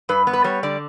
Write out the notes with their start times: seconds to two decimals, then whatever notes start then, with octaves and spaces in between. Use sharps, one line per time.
0.09 G2 B4
0.27 B3
0.33 B4
0.44 G3 C#5
0.63 D3 D5